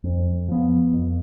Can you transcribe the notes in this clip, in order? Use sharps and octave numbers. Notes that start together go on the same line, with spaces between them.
F2
F3 B3
F2